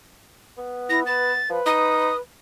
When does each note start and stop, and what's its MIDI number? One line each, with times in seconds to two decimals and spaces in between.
0.58 1.41 59
0.90 1.06 64
0.90 1.00 94
1.06 1.33 71
1.06 1.49 93
1.50 1.60 53
1.50 2.21 71
1.66 2.10 63
1.66 2.17 87